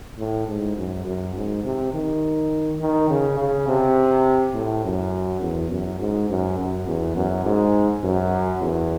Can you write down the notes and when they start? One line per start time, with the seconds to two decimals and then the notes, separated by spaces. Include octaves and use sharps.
0.19 A2
0.48 G#2
0.77 F#2
1.06 F#2
1.35 G#2
1.64 C3
1.94 D#3
2.81 D#3
3.10 C#3
3.39 C#3
3.68 C3
4.54 A2
4.84 F#2
5.41 E2
5.71 F#2
6.00 G#2
6.30 F#2
6.58 F#2
6.87 E2
7.16 F#2
7.45 G#2
8.04 F#2
8.61 E2